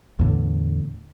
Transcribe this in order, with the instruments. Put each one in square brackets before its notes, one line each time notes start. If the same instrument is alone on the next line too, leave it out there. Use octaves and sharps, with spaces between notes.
[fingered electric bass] E2 A2 D3